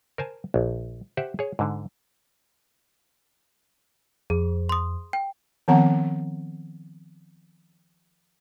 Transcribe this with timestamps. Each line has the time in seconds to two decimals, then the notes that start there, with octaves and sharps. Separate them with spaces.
0.18 A#4 C5 G#5 A5
0.54 A#1
1.17 G4 C5 E5 F#5
1.39 G#4 C#5
1.59 G#2 D3
4.30 F2 G#4
4.69 C6 D#6
5.13 G5
5.68 D#3 F3 B3 C4 F#5 A#5